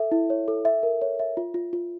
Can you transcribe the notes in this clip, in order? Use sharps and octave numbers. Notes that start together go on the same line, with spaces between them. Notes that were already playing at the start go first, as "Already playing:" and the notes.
Already playing: A4 E5
E4
C#5
A4
E5
A#4
C#5
E5
F4
F4
F4